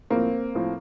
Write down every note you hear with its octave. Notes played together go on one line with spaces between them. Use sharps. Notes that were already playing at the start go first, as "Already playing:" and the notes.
A2 F3 A#3 C4
A2 F3